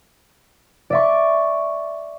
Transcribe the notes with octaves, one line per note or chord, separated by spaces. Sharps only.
D5 E5 C#6